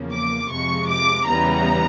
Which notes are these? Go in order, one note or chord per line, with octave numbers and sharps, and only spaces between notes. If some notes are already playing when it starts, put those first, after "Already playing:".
Already playing: E2 C#3 F3 A#3
D6
F2 C3 F3 G#3 C#6
D6
E2 C#3 E3 G3 B3 A#5